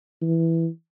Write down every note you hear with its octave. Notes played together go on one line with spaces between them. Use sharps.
E3